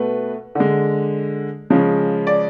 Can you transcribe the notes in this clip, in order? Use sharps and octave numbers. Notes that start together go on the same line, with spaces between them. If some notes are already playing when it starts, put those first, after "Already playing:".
Already playing: B2 A3 B4
D3 G#3
C#3 F3 G#3
D5